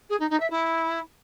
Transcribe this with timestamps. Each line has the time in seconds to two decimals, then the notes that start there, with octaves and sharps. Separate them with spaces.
0.09 G#4
0.19 D#4
0.30 D#4
0.40 E5
0.50 E4